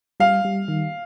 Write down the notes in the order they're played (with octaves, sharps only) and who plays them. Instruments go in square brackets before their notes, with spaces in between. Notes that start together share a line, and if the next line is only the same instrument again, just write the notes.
[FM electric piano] G3 [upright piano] F5
[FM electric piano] G3
D#3